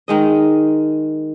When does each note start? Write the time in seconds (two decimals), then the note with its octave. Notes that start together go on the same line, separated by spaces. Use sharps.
0.08 D#3 G#3 D#5